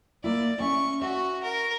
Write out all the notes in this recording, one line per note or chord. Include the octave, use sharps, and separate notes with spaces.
A#3 E4 D5
C#4 E5 C#6
F#4 E5
A#4